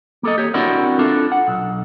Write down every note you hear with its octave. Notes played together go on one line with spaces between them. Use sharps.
A#3 A4 D#5
G4 C#5
C4 D4 E4 F#4 A#4 D5
D4 F4 A4
F#5
B1